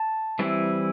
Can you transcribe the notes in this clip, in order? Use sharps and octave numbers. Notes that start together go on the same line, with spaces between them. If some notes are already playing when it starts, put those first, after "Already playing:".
Already playing: A5
E3 G3 C4 E4